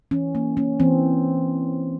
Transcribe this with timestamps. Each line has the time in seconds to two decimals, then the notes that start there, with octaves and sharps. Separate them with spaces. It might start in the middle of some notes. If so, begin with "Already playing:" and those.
0.11 E3 C#4
0.35 A#3
0.57 A#3 C#4
0.80 E3 C4